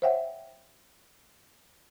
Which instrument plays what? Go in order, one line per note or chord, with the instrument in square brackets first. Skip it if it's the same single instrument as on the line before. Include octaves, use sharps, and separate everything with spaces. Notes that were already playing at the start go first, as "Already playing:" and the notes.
[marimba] C5 C#5 E5 F#5 G5